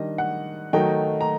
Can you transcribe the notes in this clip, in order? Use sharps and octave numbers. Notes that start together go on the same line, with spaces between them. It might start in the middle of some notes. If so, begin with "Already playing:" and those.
Already playing: D#3 G3 D4 D#5
F#5
D#3 F#3 A3 D#4 G5
A#5